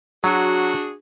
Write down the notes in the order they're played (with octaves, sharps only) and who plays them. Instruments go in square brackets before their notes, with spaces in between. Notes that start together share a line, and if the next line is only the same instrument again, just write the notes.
[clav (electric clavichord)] F#3 [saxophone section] D4 F#4 G#4